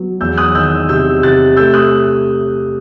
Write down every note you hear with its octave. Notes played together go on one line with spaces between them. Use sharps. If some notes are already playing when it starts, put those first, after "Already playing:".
Already playing: F#3 B3
E2 E6 G6
D#6 F#6
D#3 E6 G6
C3 E6 G6
C3 F#6 A6
A3 E6 G6
D#6 F#6